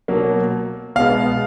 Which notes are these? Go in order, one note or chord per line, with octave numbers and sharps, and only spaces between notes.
B2 F#3 A#3
B2 G#3 B3 F5